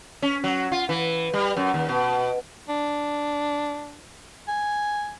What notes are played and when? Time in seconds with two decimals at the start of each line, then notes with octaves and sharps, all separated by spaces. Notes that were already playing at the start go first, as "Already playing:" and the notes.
0.22 C#4
0.44 F#3
0.72 F4
0.89 E3
1.34 G3
1.57 F#2
1.74 D#2
1.89 B2
2.69 D4
4.48 G#5